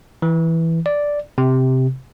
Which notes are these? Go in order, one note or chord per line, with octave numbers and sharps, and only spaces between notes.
E3
D5
C3